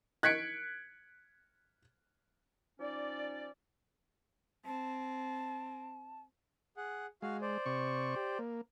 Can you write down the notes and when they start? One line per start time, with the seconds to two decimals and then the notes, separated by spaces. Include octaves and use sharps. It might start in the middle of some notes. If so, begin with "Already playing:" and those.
0.23 F#6 G#6 B6 C#7 D7
2.80 F3 C#4 D#4 D5
4.65 C4 A5
6.77 G#4 F#5
7.22 G#3 F#4 F5
7.42 C5 D5
7.66 C3 C#6
8.16 G4
8.39 A#3